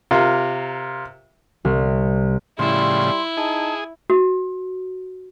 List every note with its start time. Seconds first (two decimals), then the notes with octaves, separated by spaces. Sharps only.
0.11 C3 F4 A#4
1.65 C2
2.59 A2 C#3 F3 G3 E4 C6
3.37 D#4 G#4 A5
4.10 F#4